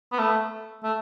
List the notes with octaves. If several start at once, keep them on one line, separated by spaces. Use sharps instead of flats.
B3
A3
A3